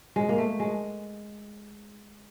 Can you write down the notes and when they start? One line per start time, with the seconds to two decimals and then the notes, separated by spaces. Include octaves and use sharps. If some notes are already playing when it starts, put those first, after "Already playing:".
0.16 G#3
0.29 A#3
0.38 A3
0.60 G#3